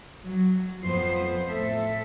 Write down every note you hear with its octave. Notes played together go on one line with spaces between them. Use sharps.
F#3
F2 B3 C5
A2 A4 E5